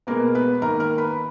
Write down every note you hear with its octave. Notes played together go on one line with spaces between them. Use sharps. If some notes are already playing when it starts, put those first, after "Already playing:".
B2 G#3 A#3 B3 A#4
B3 B4
D#3 A#3 A#4 A#5
A#4 A#5
B4 B5